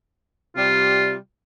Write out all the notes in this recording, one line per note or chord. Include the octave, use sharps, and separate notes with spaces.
C3 G3 F4